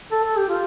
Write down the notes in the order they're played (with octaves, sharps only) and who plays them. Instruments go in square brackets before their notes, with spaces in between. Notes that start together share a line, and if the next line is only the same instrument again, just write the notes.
[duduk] A4
A4
G4
F4